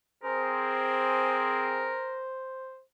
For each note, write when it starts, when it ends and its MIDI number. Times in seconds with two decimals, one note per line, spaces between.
0.23 1.97 60
0.23 1.97 68
0.23 2.26 70
0.23 2.82 72